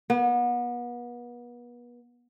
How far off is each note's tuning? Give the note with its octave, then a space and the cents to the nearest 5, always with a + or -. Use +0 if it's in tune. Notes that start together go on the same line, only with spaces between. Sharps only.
B3 -35